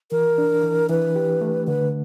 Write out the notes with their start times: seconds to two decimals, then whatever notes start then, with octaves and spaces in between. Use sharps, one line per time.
0.11 E3 A#4
0.38 D4
0.63 E3
0.89 E3 B4
1.16 G4
1.41 A3
1.68 D3 B4